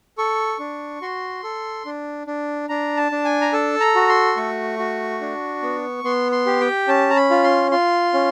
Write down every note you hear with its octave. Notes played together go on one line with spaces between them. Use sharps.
A4 C#6
D4
F#4 C6
A4
D4
D4
D4 A#5
A5
D4
G#5
A#5
A4 A5
A#5
F#4
C6
A3 C#6
F#4
D4
B3
B3 C6
C6
G4
G5
C#4 A5
A#5
B5
F4
C6
F4 C6
C#4